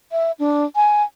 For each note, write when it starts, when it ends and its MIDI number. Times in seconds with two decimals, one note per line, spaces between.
0.12 0.32 76
0.39 0.65 62
0.76 1.03 80